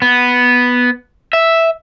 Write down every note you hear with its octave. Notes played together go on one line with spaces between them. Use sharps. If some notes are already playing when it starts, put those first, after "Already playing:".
B3
E5